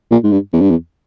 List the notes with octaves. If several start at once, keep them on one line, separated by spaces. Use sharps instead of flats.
A#2
G#2
G2
E2
G2
E2